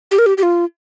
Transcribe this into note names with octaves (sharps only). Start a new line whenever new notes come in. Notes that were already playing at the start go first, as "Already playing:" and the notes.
G4
A#4
G4
G4
F4